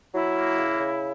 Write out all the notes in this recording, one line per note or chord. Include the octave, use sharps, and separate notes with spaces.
F#3 E4
A#3
C#3
C#3